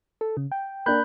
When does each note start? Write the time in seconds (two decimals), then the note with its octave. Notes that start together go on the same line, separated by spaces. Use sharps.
0.21 A4
0.37 C#3
0.52 G5
0.86 A#3 D4 B5 F#6 G6